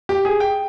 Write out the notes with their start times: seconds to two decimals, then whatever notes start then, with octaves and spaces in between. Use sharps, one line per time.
0.09 G4
0.25 G#4
0.40 G5